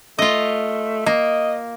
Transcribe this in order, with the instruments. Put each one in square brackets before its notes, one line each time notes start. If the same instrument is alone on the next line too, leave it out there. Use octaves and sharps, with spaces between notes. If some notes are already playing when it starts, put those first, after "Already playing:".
[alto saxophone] A3 [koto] F4 D#5
[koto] A#3 [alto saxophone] D#5